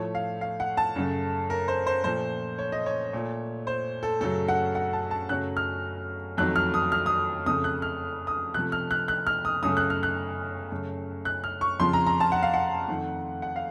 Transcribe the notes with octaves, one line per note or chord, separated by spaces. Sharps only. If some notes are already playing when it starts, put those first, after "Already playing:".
Already playing: A2 F3 A3 C#5
F5
F5
F#5
A5
F#2 C#3 A3
A#4
C5
C5
A#2 F3 A3 C5
C#5
D#5
C#5
A#2 A3
C5
A4
F#2 C#3 F#3 A3 A4
F#5
F#5
A5
A5
F#2 C#3 F#3 A3 F#6
F6
F2 D#3 F#3 A3 F#6
F6
D#6
F6
D#6
F2 C#3 A3 D#6
F#6
F6
D#6
C3 F3 A3 F#6
F6
F#6
F#6
F6
D#6
F#2 C#3 A3 D#6
F#6
F6
F#6
F#2 C#3 A3
F#6
F6
C#6
F2 C#3 F3 C6
A#5
A#5
A5
F#5
F5
F#5
F2 D#3 A3
F#5
F5